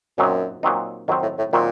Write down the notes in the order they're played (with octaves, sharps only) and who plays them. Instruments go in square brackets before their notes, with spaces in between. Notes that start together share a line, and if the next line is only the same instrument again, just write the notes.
[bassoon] F#2 [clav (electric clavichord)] A#2 F#3 C4 D#4
[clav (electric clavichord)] A#2 F#3 C4 D#4
[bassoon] F2 [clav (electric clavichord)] D#3 F#3 C4
[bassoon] A2
A2
[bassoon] A#2 [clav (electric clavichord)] D#3 F#3 C4